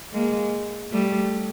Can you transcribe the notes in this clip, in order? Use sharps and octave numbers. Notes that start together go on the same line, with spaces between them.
G#3 A#3
G3 A3